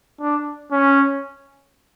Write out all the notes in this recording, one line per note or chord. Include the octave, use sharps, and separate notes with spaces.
D4
C#4